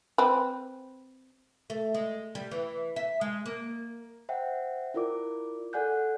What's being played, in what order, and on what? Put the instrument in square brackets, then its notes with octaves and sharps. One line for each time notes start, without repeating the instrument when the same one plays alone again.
[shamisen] C4 B4
[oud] A3
G#3
G3
E3
E5
G#3
A#3
[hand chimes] C5 E5 F#5 G5
E4 F4 A#4 D5 D6
A4 D5 F#5 G#5 F#6 G6